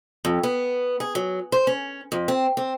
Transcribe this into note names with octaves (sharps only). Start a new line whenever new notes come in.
F2
B3
G#4
F#3
C5
C#4
F2
C4
C4